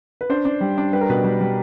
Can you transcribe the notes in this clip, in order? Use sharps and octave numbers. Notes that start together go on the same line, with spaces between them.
B4
D4 C5
D4
G3
D4
G3 B4
A#4
B2 B4
G3
G3